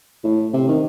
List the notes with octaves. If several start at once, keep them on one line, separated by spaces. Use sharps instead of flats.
A2
C3
D#3